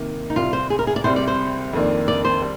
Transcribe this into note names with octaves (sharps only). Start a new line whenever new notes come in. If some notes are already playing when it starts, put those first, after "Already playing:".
Already playing: C3 D#3 A#3
D#4
C2 C3 G3 F4
C5
G#4
A#4
G#4
D5
C2 C3 G3 C4 C5
D5
C5
F2 D#3 A#3 D4
D5
C5
G3